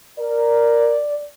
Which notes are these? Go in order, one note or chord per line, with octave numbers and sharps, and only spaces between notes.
A#4 D5